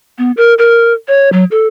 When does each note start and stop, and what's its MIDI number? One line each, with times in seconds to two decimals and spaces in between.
0.18 0.31 59
0.37 0.54 70
0.58 0.93 70
1.08 1.31 73
1.32 1.44 54
1.51 1.66 69